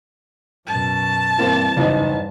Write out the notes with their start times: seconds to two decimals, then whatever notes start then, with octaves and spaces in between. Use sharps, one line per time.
0.67 F#2 B2 A5
1.38 G2 E3 A#3 C4
1.76 F#1 E2 G2 D#4